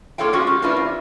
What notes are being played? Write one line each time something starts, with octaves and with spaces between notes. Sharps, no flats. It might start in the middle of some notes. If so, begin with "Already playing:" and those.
A#3 F4 A4 C#5 F5 G5
F3 G#3 C#4 F4 F#4
G4
A#3 C#4 D4 E4 F4 B4
F2